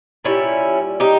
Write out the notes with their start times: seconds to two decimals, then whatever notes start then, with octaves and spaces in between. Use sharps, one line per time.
0.24 A#2 G3 C#4 E4
1.00 D#4 G4